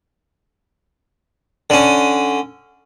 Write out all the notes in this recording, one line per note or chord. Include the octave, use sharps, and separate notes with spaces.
D3 C#4